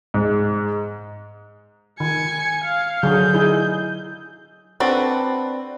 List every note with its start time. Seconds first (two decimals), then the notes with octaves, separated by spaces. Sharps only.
0.14 G#2
2.00 D#3 G#5 C#7
2.64 F5
3.03 D3 F#3 G#4 G6
3.34 D#4 E4 G#4
4.80 C4 D4 F#4 A4 B4